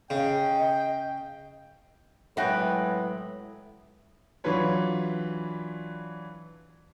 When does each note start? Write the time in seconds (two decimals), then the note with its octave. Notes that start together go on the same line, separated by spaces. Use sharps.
0.10 C#3 D#5 G5
2.37 A2 E3 F#3 G#3 B3 F#4 G5
4.44 E3 F#3 D4 F4 B4 C#5